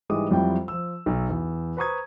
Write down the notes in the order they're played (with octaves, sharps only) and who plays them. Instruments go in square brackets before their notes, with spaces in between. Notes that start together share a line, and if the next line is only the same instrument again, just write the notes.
[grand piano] G#2 E3 G3 G#3 D6 D#6
F2 F#3 G3 E4 F4 G5
F3 E6
B1
E2
B4 C5 A#5 C#6 D#6 G#6